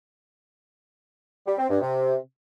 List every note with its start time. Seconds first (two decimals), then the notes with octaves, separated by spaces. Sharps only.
1.46 G3
1.58 C4
1.69 G2
1.81 C3